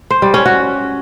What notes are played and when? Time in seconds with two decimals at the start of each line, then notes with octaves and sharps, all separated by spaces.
0.10 C5
0.22 G3
0.34 C#4
0.46 F#4